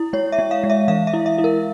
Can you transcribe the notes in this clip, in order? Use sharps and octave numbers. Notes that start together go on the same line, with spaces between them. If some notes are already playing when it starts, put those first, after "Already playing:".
Already playing: E4
G#3 C#5
E5
G#3
F5
G#3
E5
E3 F5
E5
E4
E5
E4
A#4